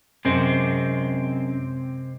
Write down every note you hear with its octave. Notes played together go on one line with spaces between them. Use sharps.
F#2 C3 G#3 C4